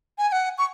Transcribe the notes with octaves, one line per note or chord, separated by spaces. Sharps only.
G#5
G#5
F#5
C#6